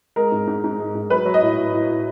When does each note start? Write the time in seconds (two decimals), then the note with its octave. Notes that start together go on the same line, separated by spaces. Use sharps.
0.16 G#3 A#4
0.32 G#2
0.47 G#2
0.64 G#2
0.79 G#3
0.95 G#2
1.10 F#3 B4
1.26 F#3
1.34 D#5
1.42 A2
1.57 A2
1.73 A2
1.88 A2